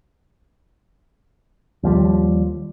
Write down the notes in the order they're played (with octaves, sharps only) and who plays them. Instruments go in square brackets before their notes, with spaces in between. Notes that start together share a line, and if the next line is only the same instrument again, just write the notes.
[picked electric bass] D#2 F3 G3